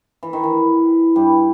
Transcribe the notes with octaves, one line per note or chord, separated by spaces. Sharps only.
E3
D#3
E3
G2 G3